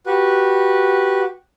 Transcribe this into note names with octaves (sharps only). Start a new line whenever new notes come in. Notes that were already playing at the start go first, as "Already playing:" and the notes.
F#4 G4 B4